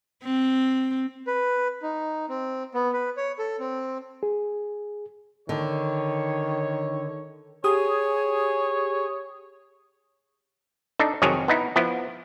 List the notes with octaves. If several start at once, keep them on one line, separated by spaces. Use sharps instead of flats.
C4
B4
D#4
C4
B3
B4
C#5
A4
C4
G#4
D3 D#3 C#5
G4 G#4 C#5 D#6
D4 D#4 A4
F2 C3 D#3 F#3 G#4 C#5
B3 D#4 E4
F3 B3 E4